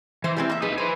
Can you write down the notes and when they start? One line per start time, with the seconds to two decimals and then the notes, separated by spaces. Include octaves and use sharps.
0.24 E3 C5
0.36 G3 G#3 C4
0.50 A#3 E5
0.62 D#4 G#4 B4
0.78 B4 C5 G#5